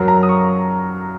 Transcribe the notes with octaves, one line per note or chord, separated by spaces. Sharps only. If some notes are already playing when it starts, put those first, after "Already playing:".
Already playing: F#2 F#3 A#4
A#5
D#6
C#6